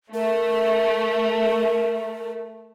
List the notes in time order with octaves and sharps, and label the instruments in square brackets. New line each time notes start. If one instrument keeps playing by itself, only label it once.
[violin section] A3 [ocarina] A#4